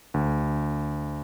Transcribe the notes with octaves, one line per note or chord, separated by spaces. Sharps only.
D2